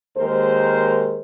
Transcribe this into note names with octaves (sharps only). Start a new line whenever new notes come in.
D#2 G#3 A#4 C5